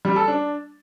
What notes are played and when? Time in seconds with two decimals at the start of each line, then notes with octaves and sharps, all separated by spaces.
0.05 G3
0.16 A4
0.28 D4